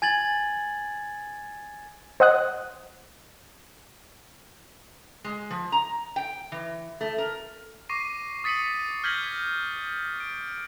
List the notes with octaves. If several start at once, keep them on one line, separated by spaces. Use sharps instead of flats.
G#5 G#6 A6 F#7
C5 D#5 F#5 D#6 F#6
G#3
F3
A#5
G5
E3
A3
A#4
C#6 D6 A#6 C7 D#7
D#6 A6 B6 C#7 D#7 F#7
F6 G6 G#6 A#6 B6 F#7
D7